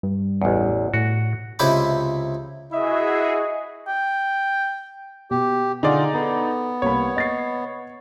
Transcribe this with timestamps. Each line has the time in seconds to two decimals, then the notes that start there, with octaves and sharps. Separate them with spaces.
0.03 G2
0.42 A1 E2
0.94 A2 F#4
1.59 C#2 C3 E4 C5 B5 D6
2.72 E4 F#4 G#4 D#5 E5
3.88 G5
5.31 B2 G4
5.83 D3 D#4 F4 G#4 D5 F#5
6.13 B3 A4 A#5
6.82 C2 A#3 C#5 B5
7.16 D#5 A6 C7